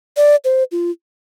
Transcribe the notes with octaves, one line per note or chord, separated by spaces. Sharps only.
D5
C5
F4